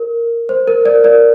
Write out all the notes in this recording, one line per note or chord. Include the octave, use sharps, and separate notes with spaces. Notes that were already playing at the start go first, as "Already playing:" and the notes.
Already playing: A#4
C5
A#4
A#4 D5
A#4 D5